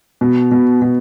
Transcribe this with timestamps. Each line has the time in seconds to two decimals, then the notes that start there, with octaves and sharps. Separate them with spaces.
0.21 B2
0.51 B2
0.82 B2